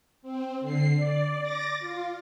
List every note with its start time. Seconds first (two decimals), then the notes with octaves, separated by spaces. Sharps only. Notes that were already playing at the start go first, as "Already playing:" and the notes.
0.22 C4
0.61 D3 C7
0.97 D5
1.41 D6 A6 A#6
1.80 F4